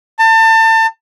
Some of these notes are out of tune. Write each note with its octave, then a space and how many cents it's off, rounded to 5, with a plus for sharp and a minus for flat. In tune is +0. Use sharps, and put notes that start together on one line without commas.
A5 +30